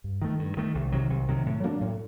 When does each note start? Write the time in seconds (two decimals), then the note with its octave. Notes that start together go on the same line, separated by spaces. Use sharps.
0.04 G2
0.22 D#3 A3
0.39 G2
0.57 D#3 A3
0.75 C2
0.92 C3 D#3 F#3
1.10 C2
1.28 C3 D#3 F#3
1.46 A2
1.64 F#3 A#3 D4
1.81 A2